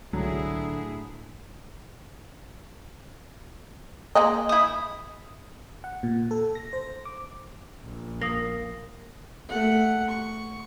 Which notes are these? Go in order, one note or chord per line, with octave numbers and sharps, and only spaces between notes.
C2 A2 D3 F#3 E4 G#4
G#3 A#3 D#5
E4 D#6
F#5
A#2
A4
A#6
C5
D6
A#1
A#3 D#6 A#6
A3 F#5
C#6